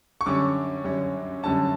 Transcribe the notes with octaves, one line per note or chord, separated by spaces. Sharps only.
C#6
F#2 D3 G3 C#4 D6
F#2 D3 G3 C#4
F#2 D3 G3 C#4 A5